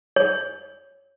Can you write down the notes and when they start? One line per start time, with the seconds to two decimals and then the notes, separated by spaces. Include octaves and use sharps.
0.16 C#5